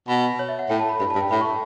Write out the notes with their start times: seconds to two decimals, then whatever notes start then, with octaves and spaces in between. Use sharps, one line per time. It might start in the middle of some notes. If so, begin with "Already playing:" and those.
0.08 B2 B5
0.39 C#5
0.49 E5
0.59 F#5
0.69 A2 G5
0.80 A5
0.89 B5
1.00 G2 B5
1.10 A5
1.15 G2
1.21 G5
1.31 A2 B5
1.41 C#6